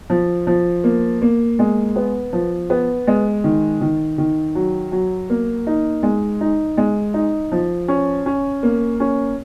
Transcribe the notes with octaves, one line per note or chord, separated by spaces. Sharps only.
F3
F3
A#3
A#3
G#3
B3
F3
B3
G#3
D#3
D#3
D#3
F#3
F#3
A#3
D#4
G#3
D#4
G#3
D#4
F3
C#4
C#4
A#3
C#4